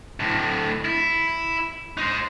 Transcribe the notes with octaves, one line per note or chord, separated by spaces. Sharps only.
D2 A2
E4
D#4 C5